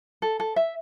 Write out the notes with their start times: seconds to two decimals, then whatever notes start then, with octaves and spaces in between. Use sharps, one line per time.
0.22 A4
0.40 A4
0.56 E5